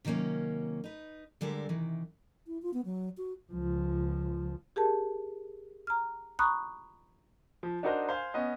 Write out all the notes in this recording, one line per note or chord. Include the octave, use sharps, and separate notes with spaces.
C3 D#3 F#3 A#3 C#4
D#4 B4
D3 G3 G#3 C4 A4 A#4
C3 D#3 E3
E4
F4
B3
F#3
F#4
C#2 F3
G4 G#4 A#4 A5
A#5 F6
A#5 B5 C#6 D#6 F#6
F3
D4 D#4 F#4 A#4 C5 D#5
C5 F5 G#5
B3 C#4 D#5